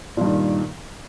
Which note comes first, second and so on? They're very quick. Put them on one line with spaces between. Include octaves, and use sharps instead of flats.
A#2 G2 D#3